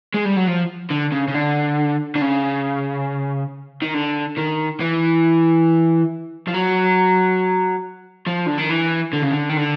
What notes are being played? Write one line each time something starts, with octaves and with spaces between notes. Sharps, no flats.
G#3
G3
F#3
F3
D3
C#3
C#3
D3
D3
C#3
D#3
D3
D#3
E3
F3
F#3
F3
D3
D#3
E3
D3
C#3
D3
D#3
D3